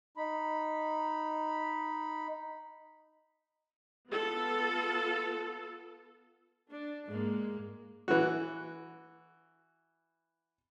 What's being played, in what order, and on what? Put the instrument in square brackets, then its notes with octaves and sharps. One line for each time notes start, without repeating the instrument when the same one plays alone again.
[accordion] D#4 B5
[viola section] B3 F4 A4
[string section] D4
G#2 G#3 A#3
[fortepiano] E3 F#4